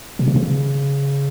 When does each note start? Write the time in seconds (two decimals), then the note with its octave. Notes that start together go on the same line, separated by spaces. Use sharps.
0.19 B2
0.28 C3
0.36 C#3